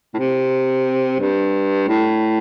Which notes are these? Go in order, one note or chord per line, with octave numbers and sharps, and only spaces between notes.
A2
C3
G2
A2